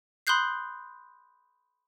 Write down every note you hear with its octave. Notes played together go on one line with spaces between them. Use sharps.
B5 C6 D#6 F#6 G6 C7